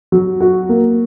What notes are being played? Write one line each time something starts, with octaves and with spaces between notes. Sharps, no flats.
F#3
F#4
A#3